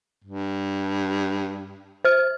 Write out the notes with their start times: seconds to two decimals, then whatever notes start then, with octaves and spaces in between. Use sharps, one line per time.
0.25 G2
2.05 C5 F6